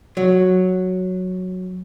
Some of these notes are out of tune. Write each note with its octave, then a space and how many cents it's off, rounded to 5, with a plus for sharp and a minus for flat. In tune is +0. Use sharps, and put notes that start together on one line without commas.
F#3 -5